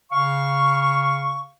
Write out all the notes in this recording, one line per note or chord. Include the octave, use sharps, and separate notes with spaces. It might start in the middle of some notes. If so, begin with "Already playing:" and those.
C#3 F5 C#6